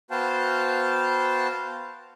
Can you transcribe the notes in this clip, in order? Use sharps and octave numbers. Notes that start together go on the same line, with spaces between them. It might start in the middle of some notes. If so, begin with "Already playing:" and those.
B3 F#4 C5 F5 G5 A5